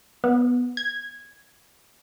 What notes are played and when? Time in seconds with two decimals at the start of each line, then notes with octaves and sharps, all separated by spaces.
0.24 B3
0.77 G#6